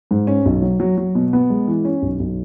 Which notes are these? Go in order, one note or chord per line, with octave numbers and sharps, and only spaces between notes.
G#2
C#4
B1
F#3
F#3
F#3
B2
B3
G#3
E3
C#4
B1
B1